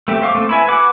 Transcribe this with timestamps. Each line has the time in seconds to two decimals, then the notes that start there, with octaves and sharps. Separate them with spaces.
0.08 A3 C4 G4
0.22 C5 F5 C#6 D6
0.35 A3 C4
0.49 E4 B4 G#5
0.67 F#4 B4 F#5 D6